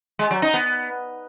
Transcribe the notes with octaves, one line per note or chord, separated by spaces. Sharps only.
G#3
F#3
D#4
B3